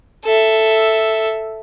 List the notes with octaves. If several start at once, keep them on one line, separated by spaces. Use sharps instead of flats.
A4 E5